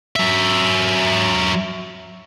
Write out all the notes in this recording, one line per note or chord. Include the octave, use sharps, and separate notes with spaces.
F#3 E5